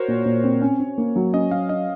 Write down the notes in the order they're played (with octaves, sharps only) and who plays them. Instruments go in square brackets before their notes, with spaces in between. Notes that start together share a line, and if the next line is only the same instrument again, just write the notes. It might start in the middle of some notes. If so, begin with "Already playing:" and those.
Already playing: [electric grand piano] F#4 A#4 C5 C#5
[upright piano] A#2
A#2
C4
C#4
C#4
A#3
F#3
[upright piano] C#4 [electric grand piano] D#5
[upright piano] F#3 [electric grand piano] F5
[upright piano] C#4 [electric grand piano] D#5